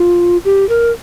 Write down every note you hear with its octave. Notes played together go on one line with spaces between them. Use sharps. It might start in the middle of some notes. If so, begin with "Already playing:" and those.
Already playing: F4
G4
A#4